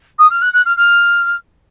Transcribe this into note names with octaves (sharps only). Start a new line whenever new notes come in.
D#6
F6
F#6
F#6
F6
F6